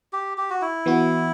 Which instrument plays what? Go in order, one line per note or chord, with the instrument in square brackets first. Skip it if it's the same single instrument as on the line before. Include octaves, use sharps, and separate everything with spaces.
[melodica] G4
G4
F#4
E4
[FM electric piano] E3 B3 F#4